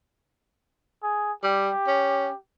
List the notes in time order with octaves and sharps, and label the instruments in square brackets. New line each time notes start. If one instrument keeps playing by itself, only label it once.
[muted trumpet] G#4
[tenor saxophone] G3 [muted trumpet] G4
[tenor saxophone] C#4